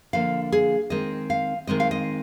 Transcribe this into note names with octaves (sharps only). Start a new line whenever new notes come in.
D3 F3 A#3 F5
G#4
D#3 G#3 C4 D#5
F5
D#3 G#3 C4 D#5
F5
D#5